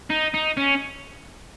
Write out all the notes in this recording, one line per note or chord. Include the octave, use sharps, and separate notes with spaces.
D#4
D#4
C#4